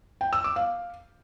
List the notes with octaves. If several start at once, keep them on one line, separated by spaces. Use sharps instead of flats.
G5
E6
D6
F5